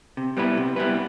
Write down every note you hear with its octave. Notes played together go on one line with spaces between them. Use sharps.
C3
G3 B3 E4 B4
C3
G3 B3 E4 B4